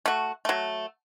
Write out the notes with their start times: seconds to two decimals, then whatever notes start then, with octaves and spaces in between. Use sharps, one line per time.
0.06 A3 F#4
0.45 F#3 A3